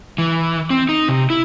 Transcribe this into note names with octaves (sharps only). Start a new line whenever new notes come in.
E3
C4
D#4
C3
E4